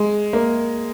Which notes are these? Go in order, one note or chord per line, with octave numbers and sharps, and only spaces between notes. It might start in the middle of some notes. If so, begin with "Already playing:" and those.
Already playing: G#3
A#3